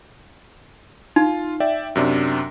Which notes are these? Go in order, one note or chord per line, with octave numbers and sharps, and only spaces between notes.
D#4 F4
D5 E5 G5
F#2 C3 D4